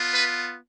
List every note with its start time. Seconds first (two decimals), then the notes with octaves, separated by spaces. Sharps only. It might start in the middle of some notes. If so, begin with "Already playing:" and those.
Already playing: B3 F4
0.11 B4